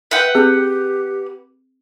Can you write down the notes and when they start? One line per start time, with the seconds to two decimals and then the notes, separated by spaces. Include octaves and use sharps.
0.11 B4 E5 F#5 G5
0.35 C4 G4 G#4